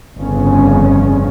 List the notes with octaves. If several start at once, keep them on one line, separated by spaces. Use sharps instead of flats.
G1 F2 C#3 C#4